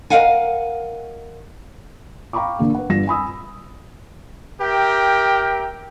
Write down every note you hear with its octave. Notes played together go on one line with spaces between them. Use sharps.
A#4 B4 D#5 F5 F#5 G#5
F5 G5 A#5 B5 C#6 D6
A#2 D3 A#3
B4 F#5
G1 G2 D4 F4 A#6 E7
G#5 B5 D#6 E6
G4 A#4 E5 G5